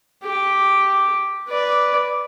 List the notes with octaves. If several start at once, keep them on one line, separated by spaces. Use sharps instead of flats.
G4
B4 D5